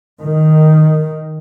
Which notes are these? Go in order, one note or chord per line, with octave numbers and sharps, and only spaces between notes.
D#3